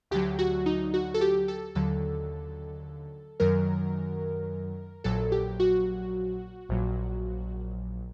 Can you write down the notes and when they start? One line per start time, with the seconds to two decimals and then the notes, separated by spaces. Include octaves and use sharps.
0.11 D2 D3 F#3 G4
0.39 F#4
0.66 D#4
0.94 F#4
1.14 A4
1.21 G4
1.48 A4
1.75 D#2 D3 F#3 A4
3.40 F#2 D#3 F#3 A#4
5.04 A#1 A#2 F#3 A4
5.32 G4
5.60 F#4
6.69 A#1 A#2 F#3